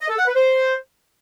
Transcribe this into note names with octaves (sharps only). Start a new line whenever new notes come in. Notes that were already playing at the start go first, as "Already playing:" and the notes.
D#5
A4
F#5
B4
C5